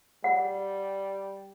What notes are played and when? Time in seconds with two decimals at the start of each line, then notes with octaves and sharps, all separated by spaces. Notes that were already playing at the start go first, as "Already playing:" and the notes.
0.24 G3 F#5